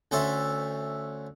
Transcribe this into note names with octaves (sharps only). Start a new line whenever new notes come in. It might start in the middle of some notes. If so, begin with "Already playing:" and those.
D2 C#4 A4 C5 E5